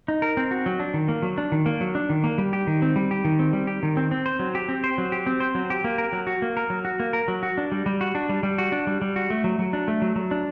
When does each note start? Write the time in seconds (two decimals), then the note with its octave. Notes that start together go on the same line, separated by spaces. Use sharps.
0.08 D#4
0.22 A#4
0.37 C4
0.51 F#4
0.66 F#3
0.79 D4
0.94 D#3
1.08 A#3
1.22 F#3
1.38 D4
1.52 D#3
1.66 A#3
1.81 F#3
1.95 D4
2.10 D#3
2.24 A#3
2.38 G3
2.53 G4
2.67 D#3
2.82 C4
2.96 G3
3.11 G4
3.25 D#3
3.39 C4
3.53 G3
3.67 G4
3.83 D#3
3.97 C4
4.11 C4
4.26 C5
4.39 F#3
4.55 G4
4.69 C4
4.84 C5
4.98 F#3
5.12 G4
5.27 C4
5.40 C5
5.55 F#3
5.70 G4
5.84 A#3
5.98 A#4
6.13 F#3
6.27 F#4
6.42 A#3
6.57 A#4
6.70 F#3
6.85 F#4
7.00 A#3
7.13 A#4
7.28 F#3
7.43 F#4
7.58 D4
7.72 G3
7.86 G3
8.01 F#4
8.15 D4
8.29 G3
8.43 G3
8.58 F#4
8.72 D4
8.87 G3
9.02 G3
9.16 F#4
9.30 A3
9.44 F#3
9.59 F#3
9.73 D4
9.88 A3
10.02 F#3
10.16 F#3
10.31 D4